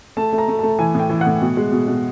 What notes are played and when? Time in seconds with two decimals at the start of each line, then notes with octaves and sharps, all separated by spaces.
0.17 A3 A5
0.33 A3
0.38 A#5
0.48 A3
0.59 A3 A5
0.79 E3 G#5
0.95 A2 G5
1.10 E3
1.21 F#5
1.26 A2
1.41 B2
1.57 G#3
1.72 B2
1.87 B2